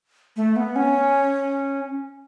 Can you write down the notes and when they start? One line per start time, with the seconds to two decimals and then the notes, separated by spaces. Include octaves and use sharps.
0.37 A3
0.56 B3
0.76 C#4